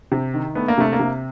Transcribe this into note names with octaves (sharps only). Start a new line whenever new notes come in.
C3
D#3
A3 B3
A#3
C3 A3
A#3
C3